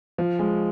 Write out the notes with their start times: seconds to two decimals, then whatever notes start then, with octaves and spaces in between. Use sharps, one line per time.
0.18 F3
0.39 G#3